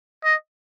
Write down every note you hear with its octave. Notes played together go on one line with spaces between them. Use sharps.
D#5